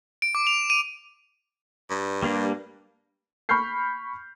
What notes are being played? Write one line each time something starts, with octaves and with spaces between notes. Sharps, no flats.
D7
D6
F7
D#7
G2
G3 A#3 D4
B5 C#6 F6 G6 C7